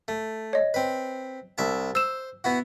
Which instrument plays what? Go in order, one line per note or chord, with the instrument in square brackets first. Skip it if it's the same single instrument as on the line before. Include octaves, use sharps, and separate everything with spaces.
[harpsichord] A3
[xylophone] C#5 D#5
[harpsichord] C4 B4
C2 E5 A5
[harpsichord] C5 [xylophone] E6 E7
[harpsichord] B3 E4 F#4